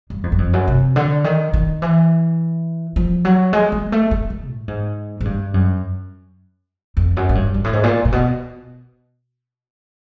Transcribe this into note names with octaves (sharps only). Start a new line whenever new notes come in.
G2
F2
F#2
F2
F#2
C3
D3
D#3
D#3
E3
F3
F#3
G#3
G#3
A3
G#3
D#3
A2
G#2
G#2
G2
F#2
F2
F#2
G#2
G2
G#2
A2
G#2
A#2
A#2
B2